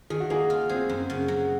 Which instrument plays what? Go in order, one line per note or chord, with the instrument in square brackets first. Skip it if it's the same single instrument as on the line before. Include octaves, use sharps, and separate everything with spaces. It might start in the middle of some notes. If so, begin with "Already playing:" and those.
[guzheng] D#3 [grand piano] G#4
[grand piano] F#4
[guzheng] A#3 [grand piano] G#4
[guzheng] F4
[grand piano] C4 [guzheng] G#4
[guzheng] F#2
C#3
F#3